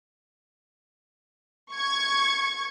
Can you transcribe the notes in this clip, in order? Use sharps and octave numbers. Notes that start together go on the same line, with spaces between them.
C#6 G#6 C#7